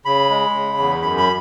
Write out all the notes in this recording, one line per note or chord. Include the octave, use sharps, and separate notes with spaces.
C#3 B5
G#3
C#3
E2
F#2 B5
B5